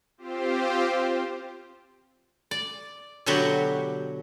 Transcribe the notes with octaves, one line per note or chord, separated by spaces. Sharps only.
C4 F4 G4 C5
D5
B2 D3 F#3 F#4 G4